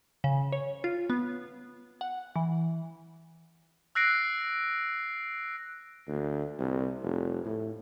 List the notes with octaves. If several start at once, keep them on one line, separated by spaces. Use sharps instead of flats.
C#3
C#5
F4
B3
F#5
E3
E6 F#6 A#6 C7 D7
D2
C2
F1
A2